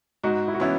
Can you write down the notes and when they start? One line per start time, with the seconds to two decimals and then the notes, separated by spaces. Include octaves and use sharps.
0.23 G#2 D#4 F#4
0.48 E4
0.54 F#4
0.60 E3 B3 C#4 E4